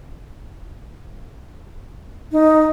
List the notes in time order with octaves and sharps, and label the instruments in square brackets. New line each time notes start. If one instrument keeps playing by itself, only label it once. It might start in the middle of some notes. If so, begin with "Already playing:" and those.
[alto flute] D#4